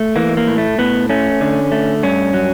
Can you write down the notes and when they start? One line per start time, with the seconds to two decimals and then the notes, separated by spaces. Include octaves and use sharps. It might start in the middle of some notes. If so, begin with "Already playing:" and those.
Already playing: A3
0.16 E3 A#3
0.37 A#3
0.47 A2
0.58 A3
0.78 A2 B3
1.10 A3 C#4
1.41 D3
1.72 A3
2.03 G2 C#4
2.34 F#3